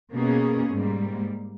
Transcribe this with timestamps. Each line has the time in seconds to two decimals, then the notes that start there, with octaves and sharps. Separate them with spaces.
0.12 B2 A#3 C#4 G#4
0.71 G#2 G3 A#3